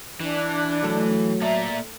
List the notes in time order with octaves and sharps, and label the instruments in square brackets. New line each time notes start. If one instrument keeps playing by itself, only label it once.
[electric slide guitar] E3 [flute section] D4
[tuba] F#3 [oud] A3 A4
[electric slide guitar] A#3 D5 A#5 [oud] A4 [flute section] E5